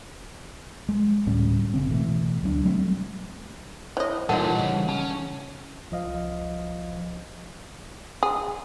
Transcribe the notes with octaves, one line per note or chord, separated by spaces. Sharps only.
G#3
D2 A2 G3 C#4
F#1 C#3 C4
B2 E3 F#3 A3
D2 F#3 B3 D4
F#3 G3 A3 C4
E4 C5 C#5 D#5
A#2 E3 G3 D#4 F4 A4 A#4 F#5
C#3
C#4 A5
C2 F3 D#5 F5
G#4